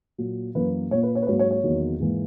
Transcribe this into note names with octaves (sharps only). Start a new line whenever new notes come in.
A#2 F#3 A#3
F#2 E3 A#3 B4
A#2 A#3 C#5
B4
C#5
B4
G#2 F#3 A#3 C#5
C#5
C#5
E2 D#3 F#3 A#3
G#2 E3 A#3